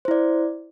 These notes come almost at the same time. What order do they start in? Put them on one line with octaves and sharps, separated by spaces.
C5 E4 D5